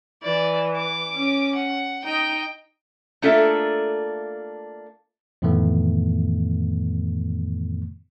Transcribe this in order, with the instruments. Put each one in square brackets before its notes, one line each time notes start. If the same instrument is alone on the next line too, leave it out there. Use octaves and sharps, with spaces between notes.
[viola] E3 [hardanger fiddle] D5
[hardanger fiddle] D6
[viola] C#4
[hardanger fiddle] F#5
[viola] D#4 D#5 [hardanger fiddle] G5
[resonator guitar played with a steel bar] A3 A#3 D4 F4 A4 E5
[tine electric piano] F2 A2 D#3 E3 A3 B3